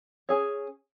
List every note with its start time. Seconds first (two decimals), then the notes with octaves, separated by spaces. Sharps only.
0.29 C#4 G#4 C#5